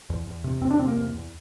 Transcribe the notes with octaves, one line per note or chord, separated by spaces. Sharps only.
E2
E2
C3
E2 C4
D4
C3 C4
A#3
E2
E2